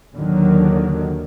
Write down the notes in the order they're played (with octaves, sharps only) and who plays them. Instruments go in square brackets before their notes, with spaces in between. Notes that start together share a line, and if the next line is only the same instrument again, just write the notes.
[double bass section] D#2 D3 D#3 F#3